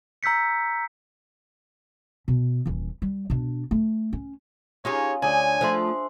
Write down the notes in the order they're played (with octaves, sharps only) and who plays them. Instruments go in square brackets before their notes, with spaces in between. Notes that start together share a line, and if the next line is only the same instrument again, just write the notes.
[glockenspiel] A#5 E6 G6 B6 C#7
[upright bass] B2
D#1 E3
G3
B2 D4
A3
C#4
[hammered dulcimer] C#4 F4 [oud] D#4 G4 G#4 [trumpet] C#5
[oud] D2 [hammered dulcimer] D4 G#4 [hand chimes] C#5 D5 [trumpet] G#5
[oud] F3 A3 [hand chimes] C5 C6 [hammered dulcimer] E5